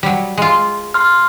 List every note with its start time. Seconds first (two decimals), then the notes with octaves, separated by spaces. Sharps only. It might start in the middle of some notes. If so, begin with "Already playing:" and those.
0.03 F#3 G3
0.38 G#3 F4
0.94 C6 F6